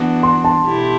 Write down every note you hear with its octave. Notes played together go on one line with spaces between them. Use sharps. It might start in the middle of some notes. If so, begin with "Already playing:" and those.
Already playing: E3 B3 D4 F#4
C6
A5
B2 A3 E4 G4